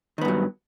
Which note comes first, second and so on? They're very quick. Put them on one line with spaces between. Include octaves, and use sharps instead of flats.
D#3 B3 G2 F#3